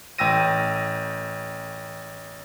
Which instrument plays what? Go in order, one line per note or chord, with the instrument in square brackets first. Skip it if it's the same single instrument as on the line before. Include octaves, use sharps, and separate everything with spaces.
[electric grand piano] A1 G5 E6 A#6 D#7